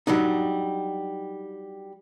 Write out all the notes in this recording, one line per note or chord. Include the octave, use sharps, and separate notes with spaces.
F#3 G3 D4 D#4